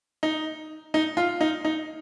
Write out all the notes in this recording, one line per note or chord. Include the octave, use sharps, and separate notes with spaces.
D#4
D#4
F4
D#4
D#4